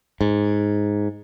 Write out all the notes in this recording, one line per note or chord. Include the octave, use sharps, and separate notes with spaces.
G#2